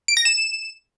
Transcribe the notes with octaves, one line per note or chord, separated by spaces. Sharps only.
D7
A#6
E7